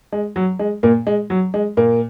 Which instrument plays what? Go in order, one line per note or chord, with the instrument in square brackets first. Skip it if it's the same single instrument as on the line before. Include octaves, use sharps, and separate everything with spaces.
[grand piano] G#3
F#3
G#3
A#2 A#3
G#3
F#3
G#3
A#2 A#3